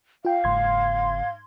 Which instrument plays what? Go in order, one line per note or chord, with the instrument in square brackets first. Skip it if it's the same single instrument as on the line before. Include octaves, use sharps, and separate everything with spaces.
[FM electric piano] F4 G5 [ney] F5
[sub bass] F#1 [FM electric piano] G#2 C6 G#6